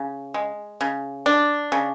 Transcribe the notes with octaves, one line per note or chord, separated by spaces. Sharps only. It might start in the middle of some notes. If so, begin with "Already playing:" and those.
Already playing: C#3
G#3
C#3
D4
C#3